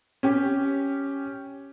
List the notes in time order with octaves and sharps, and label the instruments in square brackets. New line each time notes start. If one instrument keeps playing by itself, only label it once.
[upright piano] C#4 G4